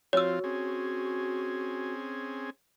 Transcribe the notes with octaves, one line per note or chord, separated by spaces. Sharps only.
F3 C4 F4 F#4 C#5 E6
C4 C#4 G#4